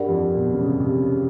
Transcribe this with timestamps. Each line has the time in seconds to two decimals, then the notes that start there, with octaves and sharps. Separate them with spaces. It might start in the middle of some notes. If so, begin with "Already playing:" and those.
Already playing: G2 G4 A#4 D5 F#5
0.09 F2
0.35 B2
0.54 C#3
0.61 C3
0.80 C3
1.00 C#3